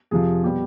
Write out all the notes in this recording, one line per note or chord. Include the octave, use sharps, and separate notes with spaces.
F2 C3 F3 G#4
B2 G3 G4